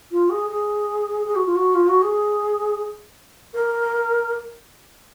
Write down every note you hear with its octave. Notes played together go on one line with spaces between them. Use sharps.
F4
G#4
G#4
G#4
F#4
F4
F#4
F4
F#4
G#4
A#4